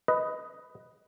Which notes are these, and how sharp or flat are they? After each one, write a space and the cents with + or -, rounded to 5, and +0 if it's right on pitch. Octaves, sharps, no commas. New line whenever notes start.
B4 +10 D#5 +5